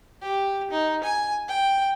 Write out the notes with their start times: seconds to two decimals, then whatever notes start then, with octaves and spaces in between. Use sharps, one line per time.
0.22 G4
0.71 D#4
1.04 G#5
1.48 G5